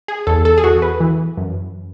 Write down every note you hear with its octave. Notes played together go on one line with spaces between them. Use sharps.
G#4
E2 A4
A4
G#4
E2 F#4
B4
E3
F#2